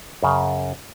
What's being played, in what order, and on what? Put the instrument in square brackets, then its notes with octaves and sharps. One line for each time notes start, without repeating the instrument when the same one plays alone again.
[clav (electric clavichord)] F#2 C#3